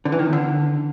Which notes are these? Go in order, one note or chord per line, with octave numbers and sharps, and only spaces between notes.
D3
E3
D#3
E2
D3